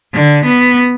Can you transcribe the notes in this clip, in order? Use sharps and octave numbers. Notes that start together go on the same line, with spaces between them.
D3
B3